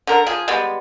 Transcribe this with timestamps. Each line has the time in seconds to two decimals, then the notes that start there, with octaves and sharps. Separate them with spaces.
0.07 D3 A#4
0.27 F3 G#4
0.48 G3 G#3 B3